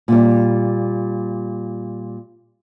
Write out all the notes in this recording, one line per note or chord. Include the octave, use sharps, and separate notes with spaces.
A#2 G3